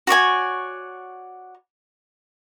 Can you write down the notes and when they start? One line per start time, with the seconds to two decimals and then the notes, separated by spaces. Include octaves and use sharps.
0.07 F#4 C#5 D5 G#5